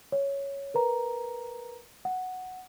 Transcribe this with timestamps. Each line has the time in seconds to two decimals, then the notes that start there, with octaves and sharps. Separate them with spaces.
0.12 C#5
0.74 A#4 B4 A#5
2.05 F#5